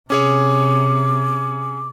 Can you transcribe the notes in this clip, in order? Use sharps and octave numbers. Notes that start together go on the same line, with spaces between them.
C3 C#4 G#4 C#5 D6